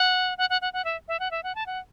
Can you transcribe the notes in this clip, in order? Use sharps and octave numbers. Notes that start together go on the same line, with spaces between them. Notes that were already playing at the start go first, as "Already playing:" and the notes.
Already playing: F#5
F#5
F#5
F#5
F#5
E5
E5
F#5
E5
F#5
A5
F#5